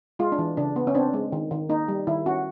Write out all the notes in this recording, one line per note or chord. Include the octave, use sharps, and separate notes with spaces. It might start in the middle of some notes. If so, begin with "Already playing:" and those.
G#3 F4
D4
E3
C#3 D4
B3
C#4
C4 D4
G#3
D#3
D#3
A#3 D#4
G3
D#3 E4
C#4 F#4